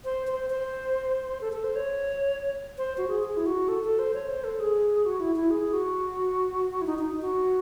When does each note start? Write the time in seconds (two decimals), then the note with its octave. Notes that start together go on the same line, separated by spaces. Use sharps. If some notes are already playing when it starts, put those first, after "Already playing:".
0.05 C5
0.27 C5
0.50 C5
1.41 A4
1.53 A4
1.64 C5
1.76 C#5
2.78 C5
2.98 F#4
3.08 G#4
3.23 G#4
3.37 E4
3.46 F#4
3.68 A4
3.84 A4
3.99 C5
4.14 C#5
4.29 C5
4.44 A4
4.60 G#4
5.06 F#4
5.20 E4
5.36 E4
5.51 G#4
5.73 F#4
6.82 E4
6.87 D#4
6.99 D#4
7.21 F#4